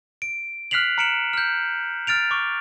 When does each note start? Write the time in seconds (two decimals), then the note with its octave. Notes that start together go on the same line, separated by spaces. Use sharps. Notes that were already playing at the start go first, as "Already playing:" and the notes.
0.22 D7
0.71 F6 F#6 B6 C7 F7 F#7
0.98 A#5 F6 C#7 D7 E7 F#7
1.33 F6 G6
2.07 F6 A6 D7 F7
2.31 C#6 D6